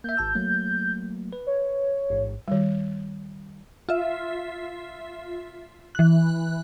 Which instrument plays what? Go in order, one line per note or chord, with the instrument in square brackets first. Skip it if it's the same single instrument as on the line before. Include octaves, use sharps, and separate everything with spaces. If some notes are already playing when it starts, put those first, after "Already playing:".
[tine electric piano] A#3 E5 [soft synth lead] G6
[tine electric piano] G#1 A5 E6
F#3 A3 A#3
B4
[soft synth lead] C#5
[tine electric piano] A1 G#2
[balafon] D#3 G3
[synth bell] F4 E5
E3 F#6